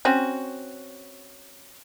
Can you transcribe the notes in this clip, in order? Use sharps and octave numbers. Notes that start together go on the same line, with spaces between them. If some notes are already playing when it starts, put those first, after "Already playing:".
C4 C#4 F#4